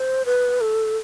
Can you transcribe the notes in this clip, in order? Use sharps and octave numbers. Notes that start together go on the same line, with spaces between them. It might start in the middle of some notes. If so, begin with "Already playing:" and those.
Already playing: C5
B4
A4